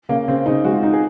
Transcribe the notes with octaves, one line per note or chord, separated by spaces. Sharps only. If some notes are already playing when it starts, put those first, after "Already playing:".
C#3 A#3
C#3 C4
C#3 D#4
G#3 F#4
F4
D#4
G#4